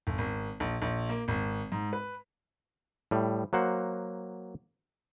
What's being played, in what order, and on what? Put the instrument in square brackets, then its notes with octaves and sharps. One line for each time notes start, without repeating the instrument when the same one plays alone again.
[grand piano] G1
G#1
A#1
A#1
A#3
G#1
G#2
B4
[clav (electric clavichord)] A2 G3
F#3 A#3 C5 F#5